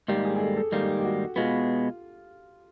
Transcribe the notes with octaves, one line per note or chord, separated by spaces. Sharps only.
G#2 D#3 G3 A#3 G4
G#4
G#4
A4
A4
G#2 D#3 G3 A#3 G4
G4
F#4
B2 G#3 B3 F4